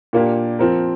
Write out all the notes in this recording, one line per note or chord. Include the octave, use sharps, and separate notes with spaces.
A#2 A#3 D4 G4
F3 C4 A#4